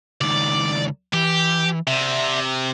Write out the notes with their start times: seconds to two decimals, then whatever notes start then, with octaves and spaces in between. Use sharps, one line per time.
0.21 C#2 D#3 D5
1.13 E3 G4
1.87 C3 D5 E5